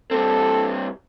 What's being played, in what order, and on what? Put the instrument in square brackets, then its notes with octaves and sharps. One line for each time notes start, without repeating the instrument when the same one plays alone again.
[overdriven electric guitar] G2 C4 [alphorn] A4